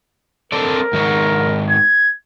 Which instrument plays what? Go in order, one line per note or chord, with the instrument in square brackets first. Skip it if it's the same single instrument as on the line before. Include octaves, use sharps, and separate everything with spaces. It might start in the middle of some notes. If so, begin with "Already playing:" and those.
[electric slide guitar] C4 A4 D5 [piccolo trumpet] A#4
[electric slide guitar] G#2 D#3 C#5
[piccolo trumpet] G#6